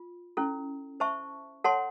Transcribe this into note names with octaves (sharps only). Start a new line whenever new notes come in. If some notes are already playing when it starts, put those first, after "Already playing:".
Already playing: F4
C#4 E4 A4
C5 E5 A5 C#6
A4 C#5 F#5 A5 C6